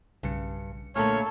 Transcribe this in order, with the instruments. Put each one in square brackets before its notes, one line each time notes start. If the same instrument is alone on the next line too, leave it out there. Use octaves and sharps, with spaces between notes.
[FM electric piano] B1 C#3 C#7 [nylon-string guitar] G2
[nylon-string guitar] A#2 D3 A3 [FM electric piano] A#3 A#5 F6 [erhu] A4 [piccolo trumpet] C#5